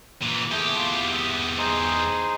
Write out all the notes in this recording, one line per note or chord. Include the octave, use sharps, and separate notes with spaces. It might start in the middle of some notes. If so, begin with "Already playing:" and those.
A#2 E3
E2 A3 G4 G#4 G#5
F4 C6
E5 D#6
D#4 G#4 C5